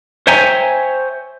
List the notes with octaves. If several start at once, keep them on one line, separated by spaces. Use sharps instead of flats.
C5 C#5 E5 G5 G#5 A#5